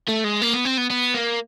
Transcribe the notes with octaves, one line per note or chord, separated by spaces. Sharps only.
A3
G#3
A#3
B3
C4
B3
B3
A#3